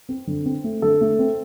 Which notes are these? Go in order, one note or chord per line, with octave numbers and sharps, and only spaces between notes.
C4
D3
C4
A3
D3 A4
A3
C4